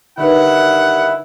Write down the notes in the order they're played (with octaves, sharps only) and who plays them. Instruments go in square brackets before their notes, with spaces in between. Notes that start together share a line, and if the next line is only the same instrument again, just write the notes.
[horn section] G2 D#3 F#5 [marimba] D3 D#4 B4 [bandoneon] E4